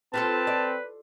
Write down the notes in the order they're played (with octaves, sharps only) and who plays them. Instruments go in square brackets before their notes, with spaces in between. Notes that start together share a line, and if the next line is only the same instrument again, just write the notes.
[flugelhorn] C4 [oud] F4 G4 A4 [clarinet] B4 [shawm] A5
[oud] D5